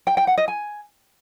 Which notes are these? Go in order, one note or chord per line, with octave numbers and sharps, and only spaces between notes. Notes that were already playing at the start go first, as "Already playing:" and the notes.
G5
G5
F#5
D#5
G#5